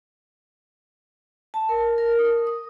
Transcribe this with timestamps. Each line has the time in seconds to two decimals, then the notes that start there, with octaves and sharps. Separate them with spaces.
1.54 A5
1.69 A#4
1.98 A#4
2.19 D#6
2.47 D#6